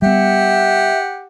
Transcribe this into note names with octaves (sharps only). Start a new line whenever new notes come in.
G3 B3 G4 E5 F#5